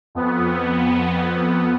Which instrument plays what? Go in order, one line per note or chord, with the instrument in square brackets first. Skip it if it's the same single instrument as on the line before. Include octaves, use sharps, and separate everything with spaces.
[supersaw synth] F2 B3